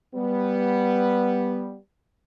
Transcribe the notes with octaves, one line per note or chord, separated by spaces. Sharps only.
G3 B3